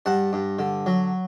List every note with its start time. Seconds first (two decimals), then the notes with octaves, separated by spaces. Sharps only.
0.06 G2 F#5 A5
0.33 G2
0.59 D3
0.86 F#3